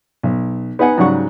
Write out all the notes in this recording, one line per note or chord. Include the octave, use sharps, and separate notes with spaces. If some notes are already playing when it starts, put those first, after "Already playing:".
B1
B3 D#4 B4 F#5 G#5
G#2 C#3 F#3 G3 F#5 C#6